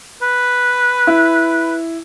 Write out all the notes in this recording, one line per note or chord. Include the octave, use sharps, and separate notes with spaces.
B4
E4